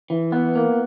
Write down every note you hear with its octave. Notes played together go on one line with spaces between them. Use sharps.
E3
B3
A#3